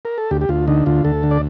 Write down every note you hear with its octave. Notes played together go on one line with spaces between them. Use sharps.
A#4
A4
D2 G4
G4
D2 F4
D3 D#4
D2 F4
D2 A4
D3
D5